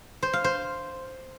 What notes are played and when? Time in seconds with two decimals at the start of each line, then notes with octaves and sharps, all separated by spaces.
0.23 C5
0.33 F5
0.44 C5